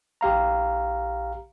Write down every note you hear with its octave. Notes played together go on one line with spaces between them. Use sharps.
A#1 G4 F5 A#5